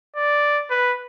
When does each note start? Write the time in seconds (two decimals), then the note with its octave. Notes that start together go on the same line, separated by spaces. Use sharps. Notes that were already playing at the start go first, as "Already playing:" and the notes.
0.16 D5
0.70 B4